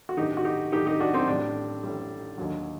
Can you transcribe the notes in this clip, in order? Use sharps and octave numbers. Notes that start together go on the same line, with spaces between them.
F#4
A1 G2 D#3 D#4 G4
F#4
D#4 G4
A1 G2 D#3 D#4 G4
D#4 G4
D4 F#4
C4 D#4
A1 A2 G3 D4
A1 A2 G3
D#2 D3 F#3